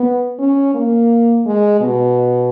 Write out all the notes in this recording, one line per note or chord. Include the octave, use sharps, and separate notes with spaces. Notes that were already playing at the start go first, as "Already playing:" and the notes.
Already playing: B3
C#4
A#3
G#3
B2